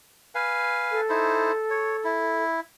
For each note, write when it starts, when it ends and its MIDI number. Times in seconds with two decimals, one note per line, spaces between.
0.35 1.01 71
0.35 1.01 77
0.35 1.01 80
0.91 2.43 69
1.09 1.52 63
1.09 1.52 64
1.09 1.52 72
1.70 1.97 73
2.04 2.60 64